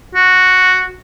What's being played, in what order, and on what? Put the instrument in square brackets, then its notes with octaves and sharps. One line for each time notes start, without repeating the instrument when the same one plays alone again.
[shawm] F#4